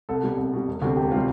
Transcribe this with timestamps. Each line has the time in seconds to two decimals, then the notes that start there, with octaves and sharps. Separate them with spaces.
0.09 C2 A4
0.23 B2 G3
0.38 C2
0.53 B2 G3
0.68 E1
0.82 D2 C3 G3
0.97 E1 G4
1.11 F4
1.14 C3 G3